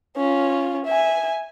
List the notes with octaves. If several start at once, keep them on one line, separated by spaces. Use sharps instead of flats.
C#4 F4
E5 G#5